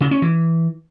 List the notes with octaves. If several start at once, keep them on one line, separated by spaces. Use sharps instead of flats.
C#3
C#4
E3